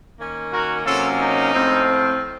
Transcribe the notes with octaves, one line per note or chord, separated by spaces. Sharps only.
D#3 A#3 C#4
F#4 A#4
C3 F#3 A#3 C#4 F4 A4
D#4
A2 F3 C4